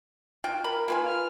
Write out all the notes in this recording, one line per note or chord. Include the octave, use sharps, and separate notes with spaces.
F4 F#4 G5
A#4 B5
A#3 F4 B4 G#5
F6